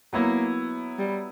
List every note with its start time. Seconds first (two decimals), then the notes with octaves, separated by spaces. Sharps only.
0.13 F#3 A#3 B3 E4
0.99 G3